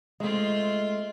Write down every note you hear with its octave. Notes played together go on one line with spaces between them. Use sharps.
G#3 A3 C4 F4 D#5